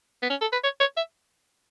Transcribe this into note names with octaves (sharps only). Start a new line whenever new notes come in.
B3
C#4
A4
B4
C#5
C#5
E5